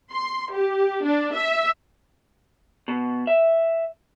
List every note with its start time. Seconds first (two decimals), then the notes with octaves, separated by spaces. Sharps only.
0.12 C6
0.52 G4
1.04 D4
1.34 E5
2.88 B2
3.27 E5